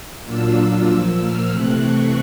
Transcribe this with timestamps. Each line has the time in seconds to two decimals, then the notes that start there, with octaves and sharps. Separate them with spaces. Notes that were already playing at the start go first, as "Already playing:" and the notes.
0.23 A#2 F#3 A#3 D4 F4 E6
0.86 A#2 F3 A#3
1.18 F6
1.49 C3 E3 A3 C4 F#6
1.80 C#6